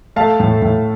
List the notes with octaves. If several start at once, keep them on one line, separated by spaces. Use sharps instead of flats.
A3 F5 A5
A2
A2